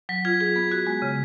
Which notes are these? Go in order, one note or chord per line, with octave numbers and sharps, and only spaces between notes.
F#3 B6
F4 G#6
G#4
B3
F#4
G#3
C#3